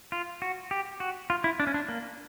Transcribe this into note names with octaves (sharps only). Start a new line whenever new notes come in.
F4
F#4
G4
F#4
F4
E4
D4
C#4
D4
A#3